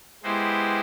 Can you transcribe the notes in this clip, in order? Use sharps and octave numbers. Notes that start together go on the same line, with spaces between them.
G#3 B3 E4 G4 C5